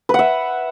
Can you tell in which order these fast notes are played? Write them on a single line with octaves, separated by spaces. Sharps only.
B4 F#5 E5